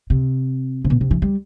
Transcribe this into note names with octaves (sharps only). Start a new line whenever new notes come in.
C3
C3
B2
C3
E3
G3